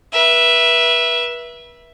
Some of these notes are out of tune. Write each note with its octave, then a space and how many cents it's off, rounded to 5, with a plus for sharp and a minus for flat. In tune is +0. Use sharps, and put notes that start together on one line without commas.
B4 -35 E5 +0